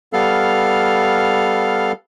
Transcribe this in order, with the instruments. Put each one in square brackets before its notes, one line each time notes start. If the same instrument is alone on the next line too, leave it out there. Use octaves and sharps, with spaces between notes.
[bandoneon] G3 B3 A4 F5 F6